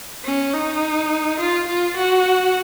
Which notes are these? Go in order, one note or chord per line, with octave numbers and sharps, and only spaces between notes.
C#4
D#4
F4
F4
F#4